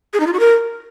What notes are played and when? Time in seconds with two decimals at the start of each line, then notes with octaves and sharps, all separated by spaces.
0.14 G#4
0.20 D#4
0.27 F4
0.33 F#4
0.40 A#4